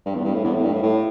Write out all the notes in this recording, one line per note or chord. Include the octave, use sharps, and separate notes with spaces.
G2
E2
G2
A2
E2
A2
G2
A2
A2